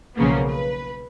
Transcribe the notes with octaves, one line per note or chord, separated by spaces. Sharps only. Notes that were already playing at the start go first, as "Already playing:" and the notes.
B1 C#3 F3 A#3 B3
B4